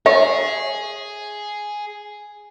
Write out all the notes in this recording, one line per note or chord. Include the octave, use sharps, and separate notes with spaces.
G#4 C#5 E5